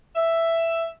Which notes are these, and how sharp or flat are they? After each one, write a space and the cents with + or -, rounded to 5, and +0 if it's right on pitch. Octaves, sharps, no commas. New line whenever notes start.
E5 +5